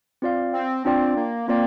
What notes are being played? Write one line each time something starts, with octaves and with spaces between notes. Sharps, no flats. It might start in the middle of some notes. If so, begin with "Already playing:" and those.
C4 F4 D5 F5
C4
C4 D4 F4 D5 G5
A#3
A#3 C4 F4 D5 G5